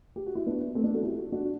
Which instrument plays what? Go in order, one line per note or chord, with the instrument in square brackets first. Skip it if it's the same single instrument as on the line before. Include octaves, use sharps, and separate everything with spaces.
[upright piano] G4
F#4
E4
B3 D4
A3 C4
B3 D4
F#4 A4
E4 G4
D4 F#4